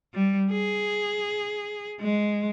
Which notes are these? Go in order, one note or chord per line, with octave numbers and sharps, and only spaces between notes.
G3
G#4
G#3